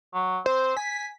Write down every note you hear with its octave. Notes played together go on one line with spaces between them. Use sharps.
F#3
C4 C5
G#5 B6